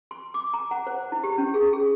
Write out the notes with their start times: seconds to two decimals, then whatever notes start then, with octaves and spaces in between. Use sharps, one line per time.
0.11 C6
0.34 D6
0.54 A#5
0.71 F#5
0.87 C5
1.12 E4
1.24 G4
1.38 C#4
1.54 G#4
1.73 G#4